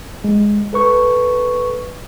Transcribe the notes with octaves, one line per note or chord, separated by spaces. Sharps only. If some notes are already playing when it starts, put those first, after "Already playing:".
G#3
A4 B4 C#6